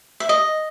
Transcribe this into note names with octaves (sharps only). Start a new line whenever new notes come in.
E5
D#5